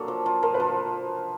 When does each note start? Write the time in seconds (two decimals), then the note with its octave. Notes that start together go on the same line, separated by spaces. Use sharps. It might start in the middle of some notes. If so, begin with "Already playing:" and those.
Already playing: F#3 A#3 D4 A4
0.08 F3
0.26 F3
0.43 F3 A#4
0.54 B4
0.60 F3